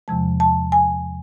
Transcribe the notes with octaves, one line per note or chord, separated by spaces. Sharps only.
E2 C3 F3 G#3 A5
A5
G#5